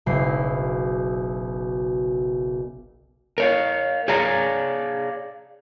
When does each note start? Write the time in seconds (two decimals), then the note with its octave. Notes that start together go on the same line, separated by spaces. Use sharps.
0.06 F#1 B1 C7
3.38 A#4 C#5 F5
4.08 G#4 C#5 D5 F5 A#5